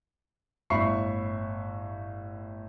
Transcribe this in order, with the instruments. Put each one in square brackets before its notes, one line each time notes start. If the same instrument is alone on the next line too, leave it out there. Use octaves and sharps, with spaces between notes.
[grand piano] G1 A2 E5 B5 C#6 C7